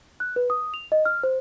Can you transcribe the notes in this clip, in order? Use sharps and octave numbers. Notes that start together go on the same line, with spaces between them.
F#6
B4
D#6
F7
D#5
F6
C5